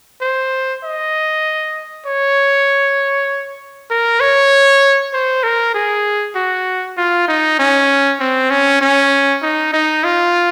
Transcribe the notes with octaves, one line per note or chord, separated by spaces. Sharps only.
C5
D#5
C#5
A#4
C#5
C5
A#4
G#4
F#4
F4
D#4
C#4
C4
C#4
C#4
D#4
D#4
F4